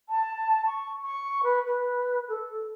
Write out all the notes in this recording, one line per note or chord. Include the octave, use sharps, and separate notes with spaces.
A5
C#6
C#6
B4
B4
A4